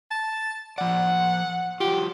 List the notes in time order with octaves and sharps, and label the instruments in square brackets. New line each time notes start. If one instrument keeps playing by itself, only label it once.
[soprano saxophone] A5
[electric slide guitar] F3 D5 [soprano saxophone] F#5
[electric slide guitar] F#3 F4 [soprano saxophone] G4